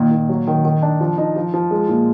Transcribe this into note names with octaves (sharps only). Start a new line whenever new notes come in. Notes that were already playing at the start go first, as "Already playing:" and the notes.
Already playing: A#2 D#3
A#2
F#3
D#3
D#3
D4
F3
D#4
F3
F3
G#3
A#2